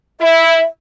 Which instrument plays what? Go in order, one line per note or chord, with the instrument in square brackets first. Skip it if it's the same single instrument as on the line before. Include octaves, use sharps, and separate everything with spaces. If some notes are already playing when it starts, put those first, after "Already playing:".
[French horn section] E4 [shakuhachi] E5